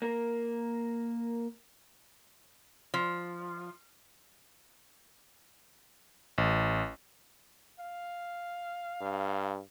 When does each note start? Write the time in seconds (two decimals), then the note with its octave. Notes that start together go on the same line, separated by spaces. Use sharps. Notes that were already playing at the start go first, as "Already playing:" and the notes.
0.02 A#3 A#4
2.94 F3
6.38 A1
7.79 F5
9.01 G2